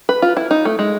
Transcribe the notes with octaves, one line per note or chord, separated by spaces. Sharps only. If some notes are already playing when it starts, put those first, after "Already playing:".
B4
F4
E4
D#4
A3
G#3